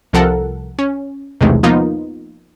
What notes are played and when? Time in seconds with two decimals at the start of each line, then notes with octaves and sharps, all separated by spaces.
0.13 C2 C3 F3 A4 A#4 F#5
0.79 C#4
1.41 B1 E2 C3 D#3 G#3 A3
1.63 F3 A#3 B3 D#4 F4